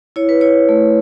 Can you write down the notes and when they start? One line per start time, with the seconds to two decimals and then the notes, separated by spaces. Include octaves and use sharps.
0.16 E4 C#5
0.29 B4
0.41 E4 C#5
0.69 A3